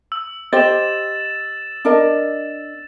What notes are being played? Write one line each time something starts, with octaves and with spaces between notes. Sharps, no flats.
E6
G4 C5 D#5 A6 E7
D4 A#4 D#5